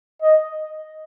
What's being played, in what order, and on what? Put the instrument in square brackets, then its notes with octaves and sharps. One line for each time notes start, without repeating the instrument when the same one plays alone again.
[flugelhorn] D#5